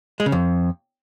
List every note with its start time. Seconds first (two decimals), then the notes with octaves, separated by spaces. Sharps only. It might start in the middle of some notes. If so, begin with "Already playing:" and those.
0.20 G#3
0.26 C#3
0.32 F2